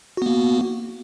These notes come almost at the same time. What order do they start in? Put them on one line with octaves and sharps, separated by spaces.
F#4 B3 A#3